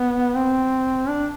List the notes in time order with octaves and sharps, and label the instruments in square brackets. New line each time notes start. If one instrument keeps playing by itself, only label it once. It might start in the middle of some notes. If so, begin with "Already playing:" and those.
Already playing: [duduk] B3
C4
D4